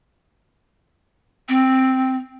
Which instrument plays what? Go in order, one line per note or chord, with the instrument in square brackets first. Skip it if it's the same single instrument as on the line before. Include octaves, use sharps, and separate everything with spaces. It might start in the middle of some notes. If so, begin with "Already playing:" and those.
[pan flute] C4